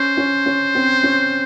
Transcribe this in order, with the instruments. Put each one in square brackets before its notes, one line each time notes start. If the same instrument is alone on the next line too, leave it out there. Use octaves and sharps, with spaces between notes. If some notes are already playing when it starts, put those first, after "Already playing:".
Already playing: [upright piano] C#4 [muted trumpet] C5
[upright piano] C#4
C#4
C4
C#4